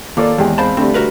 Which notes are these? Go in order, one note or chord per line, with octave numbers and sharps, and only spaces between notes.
D#2 A#3 F4 A4 D5 A5 D6
E2 G#3 G4 G5 G#5
C4 C5 F5 A5 B5
D3 G3 A3 C4
F#4 A#4 B4